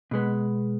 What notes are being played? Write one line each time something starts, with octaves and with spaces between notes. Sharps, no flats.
B2 G#3 B3